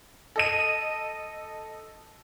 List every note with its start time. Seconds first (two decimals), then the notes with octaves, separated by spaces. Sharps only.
0.36 A4 D#5 D#7